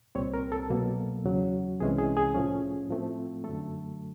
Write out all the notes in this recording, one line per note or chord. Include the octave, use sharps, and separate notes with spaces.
C2 A#2 G3 C4 C#5
A#4
A4
B2 F#3 A#3
E2 C#3 F#3
C2 C3 E3 G#3 C#4 G#4
G#4
G#4
A2 F3 A3 C#4
A2 F3 A3 C4
F#2 D3 F#3 A3 A4